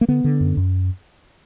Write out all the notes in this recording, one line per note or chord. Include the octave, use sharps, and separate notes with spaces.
A#3
D3 B3
D3
F#2
F#2